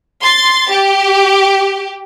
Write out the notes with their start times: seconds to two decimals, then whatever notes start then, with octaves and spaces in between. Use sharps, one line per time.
0.22 C6 A6
0.69 G4